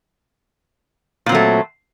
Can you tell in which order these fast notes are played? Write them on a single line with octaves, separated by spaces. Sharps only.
A#2 C4 F#3 A3